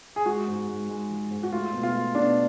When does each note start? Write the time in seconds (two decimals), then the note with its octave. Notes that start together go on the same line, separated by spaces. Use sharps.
0.16 G#4
0.26 G#3 F#4
0.48 G#2
0.69 G#2
0.89 G#3
1.10 F3
1.31 G#2
1.43 F#4
1.52 A3 F4
1.73 B2
1.83 F4
1.94 A3
2.15 B2 D4